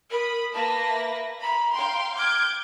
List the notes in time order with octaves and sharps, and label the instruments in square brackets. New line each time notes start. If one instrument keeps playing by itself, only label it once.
[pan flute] A#4 [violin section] B5 D#6
[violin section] A#3 B4 A#6 [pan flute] A5
[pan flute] E5
[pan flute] A#5 [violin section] B5
[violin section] F5 G5 C6
[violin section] D6 G6 G#6 [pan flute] F6